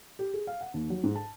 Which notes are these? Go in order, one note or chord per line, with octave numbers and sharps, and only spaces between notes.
G4
G#4
F5
F#5
D#2
F#3
G#2
A5